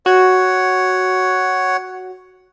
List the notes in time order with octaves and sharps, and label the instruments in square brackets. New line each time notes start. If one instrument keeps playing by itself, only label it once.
[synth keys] F#4 [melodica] C#5 F#5